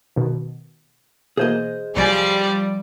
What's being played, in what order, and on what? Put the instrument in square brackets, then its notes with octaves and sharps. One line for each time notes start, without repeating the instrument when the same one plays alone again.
[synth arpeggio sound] B2 D#3
[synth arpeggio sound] B2 E3 A#3 [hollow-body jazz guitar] G#4 C5 D#5
[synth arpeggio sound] C2 G#5 [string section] F3 G3 D5